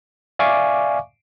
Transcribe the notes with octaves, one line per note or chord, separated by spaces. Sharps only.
D5 E5 F5 G#5 C#6 D6